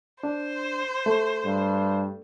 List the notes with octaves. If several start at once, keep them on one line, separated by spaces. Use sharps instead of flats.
D4 C5
A3
G2